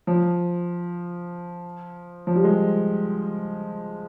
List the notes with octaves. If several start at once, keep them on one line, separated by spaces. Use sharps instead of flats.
F3
F3
G3
G#3